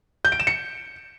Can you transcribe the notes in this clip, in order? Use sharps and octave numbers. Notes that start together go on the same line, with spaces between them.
G6
D7
E7
C#7